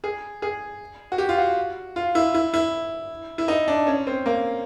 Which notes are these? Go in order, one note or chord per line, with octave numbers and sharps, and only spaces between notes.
G#4
G#4
F#4
G4
F4
F#4
F4
E4
E4
E4
E4
D#4
D4
C#4
C4
A#3